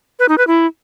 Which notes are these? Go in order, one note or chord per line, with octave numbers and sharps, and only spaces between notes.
B4
D#4
B4
E4